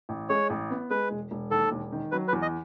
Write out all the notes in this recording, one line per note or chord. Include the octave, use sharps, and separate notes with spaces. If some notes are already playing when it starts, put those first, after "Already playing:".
A1
G#3 C#5
A1
B3
G#3 B4
E1
E1
D#2 A4
E1
D#3
F#3 B4
B4
E2
D#5